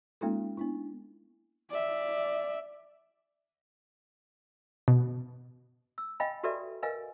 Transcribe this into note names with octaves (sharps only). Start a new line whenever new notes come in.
G#3 A#3 C#4 D#4 F4 A4
B3 D4 E4
D5 E5
B2
E6
D#5 F5 G5 G#5 B5
F#4 G4 A4 B4 D5 E5
A#4 B4 D#5 F5 G#5